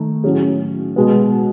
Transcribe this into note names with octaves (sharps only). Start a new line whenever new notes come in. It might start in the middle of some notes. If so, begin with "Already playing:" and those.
Already playing: D#3 A3 D#4
A2 F#3 C#4 G#4
B2 G#3 B3